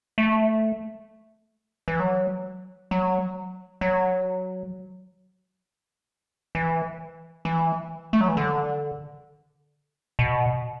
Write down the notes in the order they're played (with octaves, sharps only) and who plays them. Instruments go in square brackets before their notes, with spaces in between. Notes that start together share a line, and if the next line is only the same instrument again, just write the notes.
[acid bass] A3
E3
F#3
F#3
F#3
E3
E3
A3
F#3
E3
D3
B2